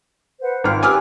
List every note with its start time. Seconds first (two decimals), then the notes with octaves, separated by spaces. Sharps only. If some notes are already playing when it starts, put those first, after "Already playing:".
0.41 B4 C5 F#5
0.64 G#1 F4 G5 F6
0.83 G4 B4 G#5 D6 E6 F6